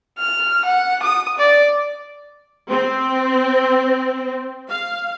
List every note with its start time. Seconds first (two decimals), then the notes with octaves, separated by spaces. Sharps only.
0.18 F6
0.65 F#5
1.03 D#6
1.38 D5
2.70 C4
4.69 F5